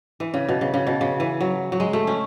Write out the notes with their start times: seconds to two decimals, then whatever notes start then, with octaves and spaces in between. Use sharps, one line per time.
0.20 E3
0.34 C#3
0.49 B2
0.61 C#3
0.74 C#3
0.87 B2
1.01 C#3
1.20 E3
1.41 F#3
1.72 F#3
1.80 G#3
1.93 A3
2.07 C#4